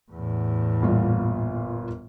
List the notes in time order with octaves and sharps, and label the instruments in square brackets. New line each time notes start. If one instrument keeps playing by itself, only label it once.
[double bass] E2 A2
[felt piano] G1 A#2 F4